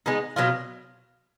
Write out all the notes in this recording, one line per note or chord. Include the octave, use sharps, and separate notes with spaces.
G#3 B3 D#4
B2 F#3 B3 F4